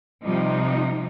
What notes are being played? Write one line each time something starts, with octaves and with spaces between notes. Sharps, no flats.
C3 F3 G3 D#4